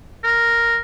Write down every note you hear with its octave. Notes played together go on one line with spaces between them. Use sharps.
A#4